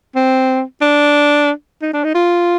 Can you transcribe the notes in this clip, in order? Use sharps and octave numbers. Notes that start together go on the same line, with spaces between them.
C4
D4
D#4
D4
D#4
F4